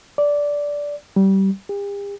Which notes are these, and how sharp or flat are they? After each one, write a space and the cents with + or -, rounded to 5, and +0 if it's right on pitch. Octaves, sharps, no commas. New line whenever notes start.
D5 -10
G3 -25
G4 +45